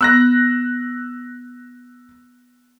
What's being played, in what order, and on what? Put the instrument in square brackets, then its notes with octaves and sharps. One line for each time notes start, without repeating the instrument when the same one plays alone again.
[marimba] B3 [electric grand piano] E6 F#6 A#6